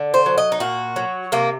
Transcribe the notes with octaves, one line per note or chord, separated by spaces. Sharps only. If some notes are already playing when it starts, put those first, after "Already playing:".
Already playing: D3
C5
F#3
D#5
D#4
A#2 F#4
F#3
C3 A#3